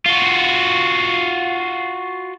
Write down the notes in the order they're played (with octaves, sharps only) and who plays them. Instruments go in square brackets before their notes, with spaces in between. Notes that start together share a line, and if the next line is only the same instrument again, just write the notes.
[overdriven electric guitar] F4 F#4